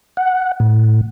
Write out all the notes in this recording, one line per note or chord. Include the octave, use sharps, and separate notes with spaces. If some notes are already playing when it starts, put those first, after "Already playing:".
F#5
A2